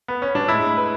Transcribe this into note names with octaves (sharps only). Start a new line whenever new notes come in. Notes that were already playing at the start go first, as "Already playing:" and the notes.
B3
C#4
D4
A2 G#3 E4
B4